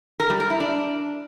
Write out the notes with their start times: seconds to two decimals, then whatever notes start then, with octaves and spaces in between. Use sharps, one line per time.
0.20 A#4
0.30 G3
0.40 A#4
0.50 E4
0.60 D4